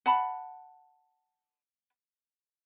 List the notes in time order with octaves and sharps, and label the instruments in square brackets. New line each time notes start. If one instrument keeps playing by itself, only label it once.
[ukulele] F#5 A5 B5